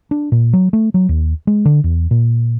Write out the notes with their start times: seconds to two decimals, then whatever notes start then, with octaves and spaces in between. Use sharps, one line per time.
0.11 D4
0.32 A#2
0.53 F#3
0.73 A3
0.94 F#3
1.09 D#2
1.47 G#3
1.65 D3
1.84 E2
2.11 A#2